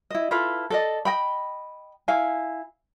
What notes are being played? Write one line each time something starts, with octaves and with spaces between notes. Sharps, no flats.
E4 D#5
E4 F4 A4 B4
A4 D5 D#5
D#5 G5 B5
E4 F5 G#5